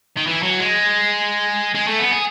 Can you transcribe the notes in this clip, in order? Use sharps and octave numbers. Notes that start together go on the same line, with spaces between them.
D#3
E3
F#3
G#3
G#3
A3
B3
G#4